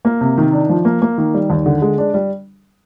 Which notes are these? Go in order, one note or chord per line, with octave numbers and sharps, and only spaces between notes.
A#3
C3
D#3
D4
F3
A#3
A#3
D#3
G3
D#2
D3
G#3
D4
G3